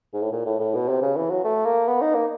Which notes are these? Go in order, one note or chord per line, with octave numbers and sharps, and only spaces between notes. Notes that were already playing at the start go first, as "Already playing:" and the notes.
G#2
A2
A#2
A2
A2
B2
C3
C#3
E3
F#3
A3
A#3
B3
D#4
A#3